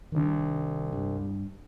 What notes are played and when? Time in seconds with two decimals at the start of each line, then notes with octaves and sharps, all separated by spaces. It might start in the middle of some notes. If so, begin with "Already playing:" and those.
0.12 C2 D#3 D4
0.92 G2